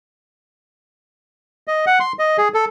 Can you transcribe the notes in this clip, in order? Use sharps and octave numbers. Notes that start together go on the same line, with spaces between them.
D#5
F#5
C6
D#5
G#4
A4